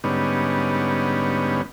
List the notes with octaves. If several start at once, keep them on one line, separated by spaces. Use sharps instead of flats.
G#2 D3 G3 B3 C#4 D#4